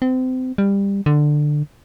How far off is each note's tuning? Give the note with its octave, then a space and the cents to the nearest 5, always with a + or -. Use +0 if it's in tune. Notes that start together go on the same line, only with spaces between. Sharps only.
C4 -30
G3 +20
D3 +15